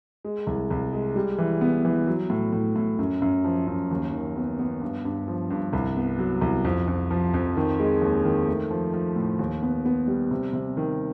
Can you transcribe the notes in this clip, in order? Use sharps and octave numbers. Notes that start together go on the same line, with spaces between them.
G#3
C2
C2
G#3
G3
E3
B3
E3
F#3
A2
A2
A2
F#2
F#2
F3
F#2
D#2
D#3
B3
B3
G2
G2
F3
G2
C2
B3
F#3
C2
F2
F2
F3
F2
D#3
G#3
D#2
D#3
A3
F3
F3
A2
D#2
B3
B3
G3
C3
C3
D#3